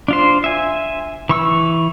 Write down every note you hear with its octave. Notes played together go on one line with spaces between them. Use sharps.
D4 F4 C5
E5 G#5
E3 C#6 E6